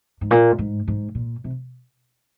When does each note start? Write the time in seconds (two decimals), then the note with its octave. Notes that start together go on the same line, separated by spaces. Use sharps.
0.21 G#2
0.31 A#2
0.58 G#2
0.88 G#2
1.15 A#2
1.44 C3